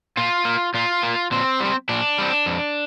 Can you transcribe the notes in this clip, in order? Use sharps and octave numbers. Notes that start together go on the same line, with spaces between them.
A#2 F4
A#3
A#2 F4
A#3
A#2 C4
G3 C4
A#2 D4
G3 C4
F2